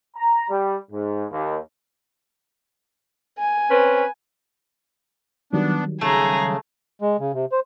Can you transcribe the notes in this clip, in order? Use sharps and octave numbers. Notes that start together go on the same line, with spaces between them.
A#5
G3
G#2
D#2
G#5
C4 C#4 B4
D#3 F#3 G3 B3 D4
C#3 A3 G#4 A#5
G#3
C#3
C3
C5